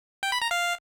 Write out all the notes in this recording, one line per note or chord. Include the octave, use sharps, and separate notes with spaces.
G5
B5
A#5
F5